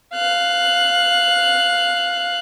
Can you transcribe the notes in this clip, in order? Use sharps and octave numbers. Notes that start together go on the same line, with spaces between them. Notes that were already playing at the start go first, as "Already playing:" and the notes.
F5 F#6